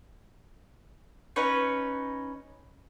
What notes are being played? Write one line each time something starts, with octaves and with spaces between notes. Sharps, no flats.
C#4 D#4 B4 C#5